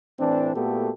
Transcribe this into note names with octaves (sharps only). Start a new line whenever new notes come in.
A2 E3 C4 D4
A#2 A3 B3 F#4 G4 A4